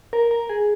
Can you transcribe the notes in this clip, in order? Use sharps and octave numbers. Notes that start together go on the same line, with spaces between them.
A#4
A#4
G#4